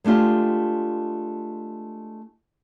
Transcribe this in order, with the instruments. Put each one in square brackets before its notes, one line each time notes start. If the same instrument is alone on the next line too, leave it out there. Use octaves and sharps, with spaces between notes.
[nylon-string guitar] G#3 A3 D4 F4 G4